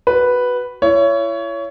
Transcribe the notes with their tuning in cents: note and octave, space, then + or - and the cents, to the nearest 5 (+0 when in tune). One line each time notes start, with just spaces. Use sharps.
F#4 +15 B4 +0
E4 +35 C#5 +20